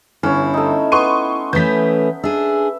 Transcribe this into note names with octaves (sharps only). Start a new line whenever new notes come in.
G1 C#4 E4 C#5
A3 D#4
B3 C6 C#6 D#7
E3 A3 C#4 G6 B6
D4 G#4 E5